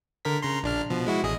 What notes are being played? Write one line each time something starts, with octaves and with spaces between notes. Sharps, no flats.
D3 A#4 B6
C#3 A#5 C6
A#1 D4 F6
B2 F3
G#3 E4 F#4
A1 G#4 D#5